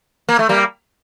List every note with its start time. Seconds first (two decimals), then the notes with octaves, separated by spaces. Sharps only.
0.29 A#3
0.39 A3
0.49 G3 A#3